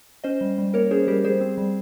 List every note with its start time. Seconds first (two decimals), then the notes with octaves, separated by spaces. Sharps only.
0.24 C#4 C5 D#5
0.41 G3
0.58 G3
0.74 A#3 A#4 C#5
0.91 C#4 G#4 C5
1.07 G3 G4 A#4
1.24 G3 G#4 C5
1.41 C4
1.58 G3